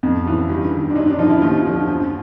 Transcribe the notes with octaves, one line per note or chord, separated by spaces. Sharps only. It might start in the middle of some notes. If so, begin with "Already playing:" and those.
F2
C#3 E3
G2
D#3
D4
F#2 D#4
D4
D3 F3 D#4
E4
D#2 F4
D3 F3
F#2